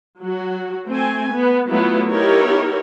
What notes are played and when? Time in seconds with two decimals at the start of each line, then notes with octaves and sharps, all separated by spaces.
0.22 F#3 F#4
0.87 A3 C4 G#5
1.33 B3
1.69 F#3 A3 B3 E4 F4
2.09 B3 D#4 E4 G4 A#4 C#5